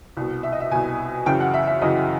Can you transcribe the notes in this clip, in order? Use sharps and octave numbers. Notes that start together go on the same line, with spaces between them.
C2 B2
E5
D#5
E5
C2 B2 G#5
F#2 C#3 E3 G5
F#5
E5
E5
F#2 C#3 E3 D#5